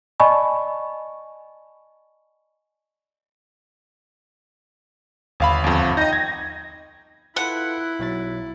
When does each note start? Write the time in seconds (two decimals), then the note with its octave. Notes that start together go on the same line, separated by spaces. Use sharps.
0.20 D5 D#5 G#5 A5 B5 C#6
5.40 G1 D#2 F5 B5
5.64 G1 F2
5.97 D#4 D#5 G5 A#6
6.13 G#6
7.36 E4 F4 A4 B4 F#5
7.99 B1 F#3 A6